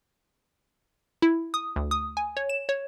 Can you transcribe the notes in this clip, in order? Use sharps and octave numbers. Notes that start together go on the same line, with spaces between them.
E4
D#6
D2
D#6
G#5
C#5
E7
C#5